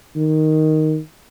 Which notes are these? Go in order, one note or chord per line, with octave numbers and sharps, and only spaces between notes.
D#3